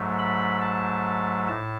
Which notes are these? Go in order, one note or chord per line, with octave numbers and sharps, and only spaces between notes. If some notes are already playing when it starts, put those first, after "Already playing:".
Already playing: G#2 F#3 A3
B5
A5
A2 A5